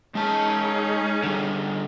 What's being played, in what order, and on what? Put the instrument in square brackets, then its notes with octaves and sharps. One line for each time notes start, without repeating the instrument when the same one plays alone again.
[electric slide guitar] G#3 A5 [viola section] C#4 D#4 G#4
[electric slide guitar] D3 G3